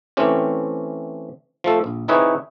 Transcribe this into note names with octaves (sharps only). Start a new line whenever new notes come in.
E3 A3 C4 C#4 G4
F3 A3 A4
A#1
C4 D#4 E4 G#4 B4 C#5